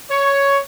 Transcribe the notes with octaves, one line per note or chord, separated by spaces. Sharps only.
C#5